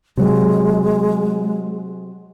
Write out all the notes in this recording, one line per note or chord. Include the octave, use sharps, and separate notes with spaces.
C3 F#3 G#3